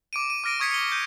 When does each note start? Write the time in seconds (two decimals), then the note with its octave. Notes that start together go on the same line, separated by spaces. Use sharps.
0.13 D6 D7 D#7
0.30 D#7
0.44 D6 F6 A#6 D7 D#7
0.60 C#6 D#6 G#6 B6 C#7
0.71 C#7 G7
0.92 G6